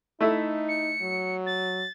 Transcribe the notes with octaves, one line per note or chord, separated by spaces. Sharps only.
A3 D#4 E4
C#7
F#3
A6